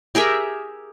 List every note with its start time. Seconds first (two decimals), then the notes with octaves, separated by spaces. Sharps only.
0.15 G4 G#4 A#4 E5